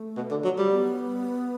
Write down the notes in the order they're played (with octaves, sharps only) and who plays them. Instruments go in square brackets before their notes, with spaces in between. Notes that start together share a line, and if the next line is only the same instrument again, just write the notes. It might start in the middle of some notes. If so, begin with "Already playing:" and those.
Already playing: [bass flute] A3
[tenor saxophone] B2
D3
F#3
G3
[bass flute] B3